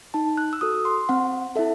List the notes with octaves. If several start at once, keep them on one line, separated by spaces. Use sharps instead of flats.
D#4 A5
F#6
E6
F#4 A4 D#6
C6
C4 F#5
E4 A4 E5